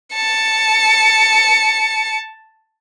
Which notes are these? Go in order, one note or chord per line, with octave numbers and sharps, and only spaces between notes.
A5 C#7